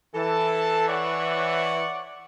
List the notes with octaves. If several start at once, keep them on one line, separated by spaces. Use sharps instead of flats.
E3 A4 A5
C#5 D5 F#5